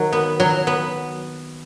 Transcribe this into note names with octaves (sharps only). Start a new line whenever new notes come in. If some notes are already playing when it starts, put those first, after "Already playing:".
Already playing: D#3 F#3
B3
F#3
B3